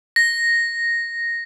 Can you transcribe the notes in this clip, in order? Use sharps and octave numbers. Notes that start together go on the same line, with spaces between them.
A#6